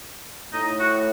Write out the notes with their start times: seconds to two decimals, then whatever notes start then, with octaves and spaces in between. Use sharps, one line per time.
0.53 A2 D#4
0.80 F#4